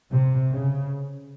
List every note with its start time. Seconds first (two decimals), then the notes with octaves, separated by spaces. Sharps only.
0.12 C3
0.51 C#3